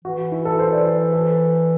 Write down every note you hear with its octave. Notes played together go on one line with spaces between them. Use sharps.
E3 F#4
F#4
E4
A4
C5
D5
C5
A4